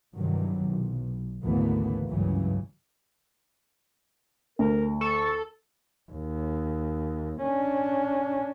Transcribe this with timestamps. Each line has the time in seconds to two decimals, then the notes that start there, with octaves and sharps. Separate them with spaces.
0.16 G2 C3 D#3 E3 F#3
0.67 B1
1.43 G#1 D2 C#3 E3 A#3 B3
2.10 C#2 G2 C#3 E3 F#3
4.59 D2 A#4
5.01 A4 C#6
6.12 D#2
7.44 C#4 D4